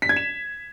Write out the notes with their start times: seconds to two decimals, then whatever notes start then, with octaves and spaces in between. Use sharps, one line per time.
0.02 B6
0.09 G#6
0.16 E7